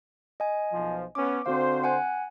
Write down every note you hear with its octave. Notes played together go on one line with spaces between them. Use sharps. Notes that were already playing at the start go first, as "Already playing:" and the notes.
D#5 G#5
B1 F3
B3 C#4 D6
D3 C4 F#4 C5 F5
F#5 G#5 F#6